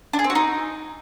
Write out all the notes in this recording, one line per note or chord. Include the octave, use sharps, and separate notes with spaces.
D4
G#4
C4
F#4
D#4